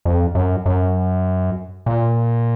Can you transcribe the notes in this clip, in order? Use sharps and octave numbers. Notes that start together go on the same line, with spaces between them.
F2
F#2
F#2
A#2